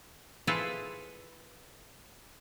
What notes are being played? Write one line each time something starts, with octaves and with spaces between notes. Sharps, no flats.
E4 F4 G#4 A4 B4 C5